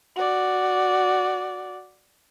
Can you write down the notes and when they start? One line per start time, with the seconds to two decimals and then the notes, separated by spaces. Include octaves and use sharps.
0.16 F#4 D5